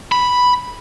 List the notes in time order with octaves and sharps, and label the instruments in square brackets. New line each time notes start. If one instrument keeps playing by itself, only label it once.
[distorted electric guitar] B5